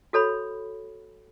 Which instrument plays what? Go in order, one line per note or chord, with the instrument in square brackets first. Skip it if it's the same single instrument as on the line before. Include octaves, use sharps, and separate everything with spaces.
[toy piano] F#4 A4 C#5 B5